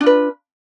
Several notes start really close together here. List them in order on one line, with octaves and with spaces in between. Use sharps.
D4 F4 B4